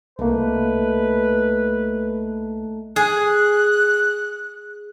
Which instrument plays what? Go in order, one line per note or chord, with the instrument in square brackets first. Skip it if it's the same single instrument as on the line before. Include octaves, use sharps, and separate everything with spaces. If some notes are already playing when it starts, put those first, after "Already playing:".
[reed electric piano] C2 A#3 [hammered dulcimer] A3 D#4 [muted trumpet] B4
[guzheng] G#4 [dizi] F#6